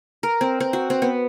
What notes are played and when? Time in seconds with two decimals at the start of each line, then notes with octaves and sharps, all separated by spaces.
0.23 A#4
0.41 C4
0.60 C4
0.73 F#4
0.90 C4
1.02 B3